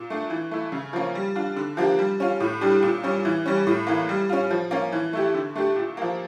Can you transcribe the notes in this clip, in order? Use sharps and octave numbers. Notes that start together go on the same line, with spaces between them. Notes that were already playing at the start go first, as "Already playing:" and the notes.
Already playing: A#2
A3 D4
E3
A3 E4
C#3
F3 A#3 C#4
G3
D4 F4
D3
F3 A#3 D4 G4
G3
C#4 F4
A2
G3 D4 G4
A#2
G3 C#4
E3
G3 C#4
A2
E3 A#3
G3
C#4 F4
F3
A#3 C#4
E3
A3 E4 G4
D3
A3 D4 G4
A#2
F3 A#3